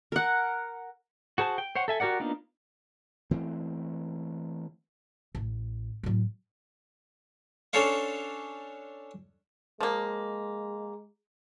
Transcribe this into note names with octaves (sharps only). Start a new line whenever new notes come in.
A#4 F#5
F#4 G#4 C5 A5
G5
C5 C#5 F#5
A4 E5 G#5
F#4 G4 A#4 D5 F#5
A#3 B3 D4 D#4 F4
E3 A3 C4
A1
A2 F#3
C#4 D4 A4 C5 C#5 F5
F3 G#3 A#3